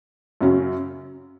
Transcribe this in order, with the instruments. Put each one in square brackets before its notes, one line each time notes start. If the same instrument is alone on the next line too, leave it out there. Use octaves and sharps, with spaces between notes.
[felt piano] F#2 C#3 F#3 C#4